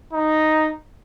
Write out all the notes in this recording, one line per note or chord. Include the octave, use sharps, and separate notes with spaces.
D#4